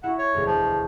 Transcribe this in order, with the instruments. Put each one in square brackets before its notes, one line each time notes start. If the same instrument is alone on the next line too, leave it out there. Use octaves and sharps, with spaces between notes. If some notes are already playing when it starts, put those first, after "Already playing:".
[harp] E4 F#4 [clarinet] F#5
[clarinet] C#5
[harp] E1 D2
[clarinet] F3